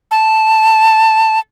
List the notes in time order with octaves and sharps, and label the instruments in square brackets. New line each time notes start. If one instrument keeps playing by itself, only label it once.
[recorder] A5